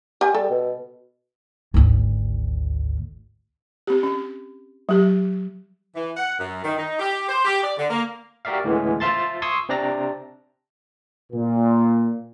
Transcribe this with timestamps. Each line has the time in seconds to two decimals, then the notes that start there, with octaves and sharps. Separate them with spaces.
0.21 G4 G#5
0.35 G3 A4
0.50 B2
1.74 G#1 D2
3.87 C4 G4
4.03 C#4
4.89 F#3 G4
5.95 E3
6.17 F#5
6.39 F#2
6.65 D#3
6.78 D#4
7.00 G4
7.29 C5
7.45 G4
7.64 D5
7.78 D3
7.90 A#3
8.45 F#4 G4 A#4 D5 E5 F5
8.64 D2 A2 E3 G#3 B3 C#4
9.00 F4 C5 E5 A5 C6 A6
9.42 C6 C#6 D#6 E6 G#6
9.69 C3 C4 D4 D5 A#5 A#6
11.33 A#2